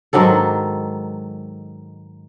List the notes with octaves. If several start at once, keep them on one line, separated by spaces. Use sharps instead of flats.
G#2 D#3 F#3 A4